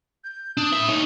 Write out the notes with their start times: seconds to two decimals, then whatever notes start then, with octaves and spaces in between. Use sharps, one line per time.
0.24 G6
0.57 D4 D#6
0.73 A2 E5
0.89 D#4 C#5